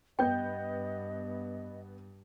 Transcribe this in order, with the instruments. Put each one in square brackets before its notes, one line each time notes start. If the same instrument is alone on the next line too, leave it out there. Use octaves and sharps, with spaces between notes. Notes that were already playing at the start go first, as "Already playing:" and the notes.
[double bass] G2 [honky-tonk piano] B3 G6 [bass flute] D#5 [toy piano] G5